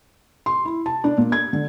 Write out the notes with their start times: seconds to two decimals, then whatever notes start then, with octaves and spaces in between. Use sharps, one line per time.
0.46 C6
0.65 E4
0.86 A5
1.04 D4
1.18 A#2
1.32 G#6
1.53 D3